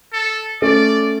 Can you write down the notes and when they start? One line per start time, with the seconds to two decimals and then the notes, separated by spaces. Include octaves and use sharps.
0.13 A4
0.62 A3 C#4 D5